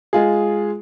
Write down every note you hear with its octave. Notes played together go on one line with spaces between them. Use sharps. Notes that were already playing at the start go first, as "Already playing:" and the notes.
G#3 F4 G#4